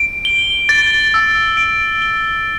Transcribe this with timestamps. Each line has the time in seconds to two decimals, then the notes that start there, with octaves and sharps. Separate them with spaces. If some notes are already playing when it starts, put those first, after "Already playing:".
Already playing: D7
0.25 G7
0.69 A6
1.14 E6
1.57 D7
2.02 G7